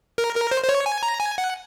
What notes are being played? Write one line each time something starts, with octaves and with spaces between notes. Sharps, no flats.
A#4
A#4
C5
C5
C#5
G#5
A#5
G#5
F#5